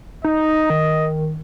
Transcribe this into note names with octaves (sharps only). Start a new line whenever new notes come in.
D#4 D#5
D#3